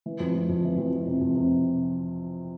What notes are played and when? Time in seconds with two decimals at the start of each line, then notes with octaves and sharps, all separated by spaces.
0.06 E3
0.20 F2
0.35 F2
0.49 F2
0.64 E3
0.78 F2
0.93 F2
1.07 C3
1.21 F2
1.36 C3